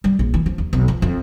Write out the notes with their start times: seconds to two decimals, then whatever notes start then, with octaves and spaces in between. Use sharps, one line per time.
0.04 G3
0.19 A#1
0.34 E3
0.46 F3
0.58 D#2
0.73 B1
0.88 F3
1.02 F2